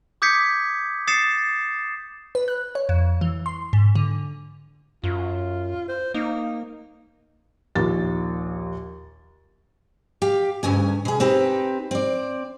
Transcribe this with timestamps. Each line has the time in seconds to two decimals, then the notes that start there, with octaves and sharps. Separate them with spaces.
0.22 D6 D#6 G6 G#6 B6 C#7
1.07 D#6 A6 C7 C#7 E7
2.35 B4
2.48 F#6
2.75 C#5
2.89 F2
3.21 E3
3.46 C6
3.73 G#2
3.95 D3
5.03 F#2 F4
5.88 C5
6.14 A#3 D#4
7.75 A#1 D#2 A6
10.22 G4 F5
10.63 D2 G2 C#3 G#5
11.05 B2 G#4
11.20 C4 D#4 G4 B4
11.91 C4 D5